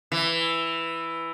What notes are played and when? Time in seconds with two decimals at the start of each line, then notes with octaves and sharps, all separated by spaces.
0.12 E3